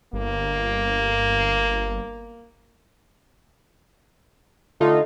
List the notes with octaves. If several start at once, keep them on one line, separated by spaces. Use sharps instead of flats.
G1 A#3
D3 A3 D#4 F4